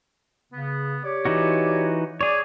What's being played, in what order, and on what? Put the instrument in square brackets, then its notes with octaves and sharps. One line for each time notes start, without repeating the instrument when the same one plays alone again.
[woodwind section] C#3 B3
G4 C#5 D5
[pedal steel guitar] E3 D#4 F#4
[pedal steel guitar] G#4 C#5 [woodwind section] D5